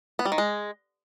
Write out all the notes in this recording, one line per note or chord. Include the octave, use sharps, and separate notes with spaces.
B3
G3
D#3
G#3